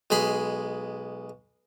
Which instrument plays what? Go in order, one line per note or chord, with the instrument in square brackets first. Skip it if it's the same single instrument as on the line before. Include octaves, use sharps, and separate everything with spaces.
[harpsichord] B1 G#3 B5 C6